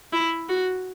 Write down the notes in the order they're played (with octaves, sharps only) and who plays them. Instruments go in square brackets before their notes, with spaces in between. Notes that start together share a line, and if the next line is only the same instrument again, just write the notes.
[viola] E4
F#4